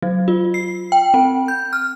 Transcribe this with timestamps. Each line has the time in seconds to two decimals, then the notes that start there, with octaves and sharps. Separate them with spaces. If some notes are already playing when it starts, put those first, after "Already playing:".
0.02 F#3
0.28 F4
0.54 C7
0.92 G5
1.14 C4
1.48 G6
1.73 F6